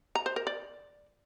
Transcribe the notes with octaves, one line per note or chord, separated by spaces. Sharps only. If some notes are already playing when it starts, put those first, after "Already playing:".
A#5
C5
A#4
D5